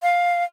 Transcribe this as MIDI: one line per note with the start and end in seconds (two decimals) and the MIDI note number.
0.02 0.44 77